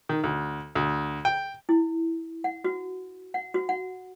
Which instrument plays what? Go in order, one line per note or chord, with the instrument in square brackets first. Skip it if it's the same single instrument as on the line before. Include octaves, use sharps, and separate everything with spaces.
[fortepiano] D#3
D2
D2
G5
[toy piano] E4
F#5
F#4
F#5
F#4
F#5